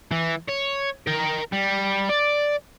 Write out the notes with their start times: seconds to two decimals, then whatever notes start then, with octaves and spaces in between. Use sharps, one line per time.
0.12 E3
0.49 C#5
1.07 A#4 G5
1.52 G3
2.09 D5